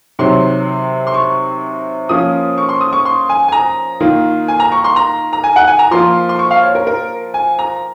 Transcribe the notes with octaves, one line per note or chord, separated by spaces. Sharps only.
C3 D#3 F#3 C6
C6
C#6
F3 A#3 C#4 F4 D#6
C#6
C6
D#6
C#6
C6
G#5
G#5
A#5
D#3 A#3 F4
G#5
A#5
C#6
C6
A#5
A#5
G#5
F#5
G#5
A#5
F3 A#3 F4 C6
C6
C#6
F5
C#5
A#4
A#4
G#5
A#5